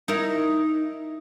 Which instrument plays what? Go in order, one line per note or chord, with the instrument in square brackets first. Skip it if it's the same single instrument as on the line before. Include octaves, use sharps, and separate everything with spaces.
[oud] D#4 E4 A#4